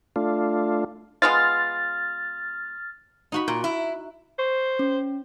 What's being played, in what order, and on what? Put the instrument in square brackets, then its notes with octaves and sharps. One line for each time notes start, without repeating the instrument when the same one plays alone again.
[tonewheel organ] A3 D4 F4
[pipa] G#3 B3 F4 [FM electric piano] F6 A6
[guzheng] D#4 F#4 B5
[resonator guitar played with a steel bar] A#2
E4
[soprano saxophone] C5 [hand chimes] C#6
[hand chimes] C#4